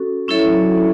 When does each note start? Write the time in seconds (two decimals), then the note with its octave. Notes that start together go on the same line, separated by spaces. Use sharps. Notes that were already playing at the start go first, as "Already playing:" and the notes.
Already playing: C#4 F#4 A4
0.28 F#3 C#4 E4 A4 C#5 E5